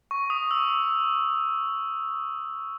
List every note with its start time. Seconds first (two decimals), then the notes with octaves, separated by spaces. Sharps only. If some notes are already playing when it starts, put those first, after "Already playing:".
0.11 C#6
0.30 D#6
0.51 E6